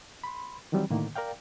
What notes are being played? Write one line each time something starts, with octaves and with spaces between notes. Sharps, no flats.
B5 C6
D#3 E3 F#3 G3 C4
A2 D3 D#3 A#3
A#4 D5 F5 G5